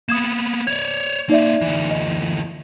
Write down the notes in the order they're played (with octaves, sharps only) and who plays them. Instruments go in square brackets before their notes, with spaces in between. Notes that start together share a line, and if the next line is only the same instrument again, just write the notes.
[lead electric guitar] A#3 B3 [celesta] D#6 G#6 E7
[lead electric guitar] C#5 D5 [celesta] G#6
[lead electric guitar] A#3 C4 [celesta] D#4 D5 E5
[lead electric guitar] D2 E3
[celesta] D#5